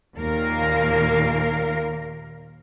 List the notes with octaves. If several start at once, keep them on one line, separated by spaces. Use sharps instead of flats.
D#2 A#2 A#3 A#4 F5